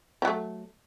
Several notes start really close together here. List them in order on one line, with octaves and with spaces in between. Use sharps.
F3 F#3 A3